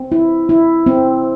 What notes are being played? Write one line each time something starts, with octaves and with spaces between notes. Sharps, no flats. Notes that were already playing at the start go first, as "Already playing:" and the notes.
Already playing: C4
E4
E4
C4